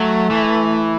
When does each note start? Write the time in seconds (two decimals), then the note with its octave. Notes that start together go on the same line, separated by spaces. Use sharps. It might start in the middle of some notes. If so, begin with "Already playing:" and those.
Already playing: F#3 A3
0.30 E3